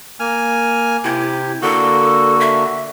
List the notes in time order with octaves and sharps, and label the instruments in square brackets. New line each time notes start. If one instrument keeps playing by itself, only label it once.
[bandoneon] A#3 G#5 F6
[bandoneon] C3 G4 [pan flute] E4
[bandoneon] D3 A#3 F#4 [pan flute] A4
[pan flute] E5